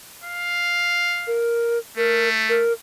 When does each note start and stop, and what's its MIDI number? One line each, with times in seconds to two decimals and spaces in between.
0.24 1.43 77
1.27 1.79 70
1.97 2.63 57
1.97 2.29 70
2.49 2.73 70